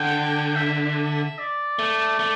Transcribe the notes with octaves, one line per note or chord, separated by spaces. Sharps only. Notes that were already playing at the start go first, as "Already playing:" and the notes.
Already playing: D3 G5
E5
D5
A3
A3